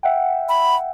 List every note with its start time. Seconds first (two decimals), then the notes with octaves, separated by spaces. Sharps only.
0.03 E5 F#5 G5
0.49 B5